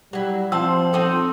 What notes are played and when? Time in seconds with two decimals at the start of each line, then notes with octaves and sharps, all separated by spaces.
0.13 F#3 G3 E4
0.52 F3 C4 C5 A5 E6
0.93 C4 D#4 A4